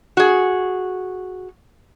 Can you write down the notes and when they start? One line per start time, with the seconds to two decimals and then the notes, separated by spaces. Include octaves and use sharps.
0.17 F#4 G#4